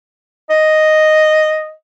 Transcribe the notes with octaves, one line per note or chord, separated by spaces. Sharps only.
D#5